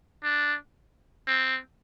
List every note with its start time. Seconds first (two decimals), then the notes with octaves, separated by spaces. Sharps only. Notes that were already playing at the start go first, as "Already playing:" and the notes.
0.23 D4
1.27 C4